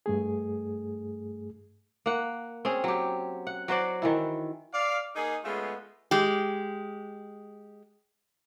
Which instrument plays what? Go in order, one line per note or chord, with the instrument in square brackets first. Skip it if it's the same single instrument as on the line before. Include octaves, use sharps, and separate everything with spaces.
[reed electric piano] G2 A3 G#4
[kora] A#3 F#5
C4 C#4 G#4
F#3 G4
F#5
F#3 F#4 C5 D5
D#3 E3 E4
[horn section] D5 F5
A#3 D#4 G#4
G#3 A3 B3 C#4 F4
[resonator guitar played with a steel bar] G#3 G4